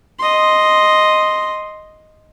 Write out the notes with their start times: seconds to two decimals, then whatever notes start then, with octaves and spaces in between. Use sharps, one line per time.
0.19 D#5 C6